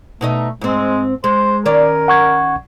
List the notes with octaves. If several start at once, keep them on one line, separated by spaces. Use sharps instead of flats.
B2 A3 D#4 D#5
G#2 G#3 C4
G#3 C5
D#3 C#4 A#4 D5
F#5 C#6 G#6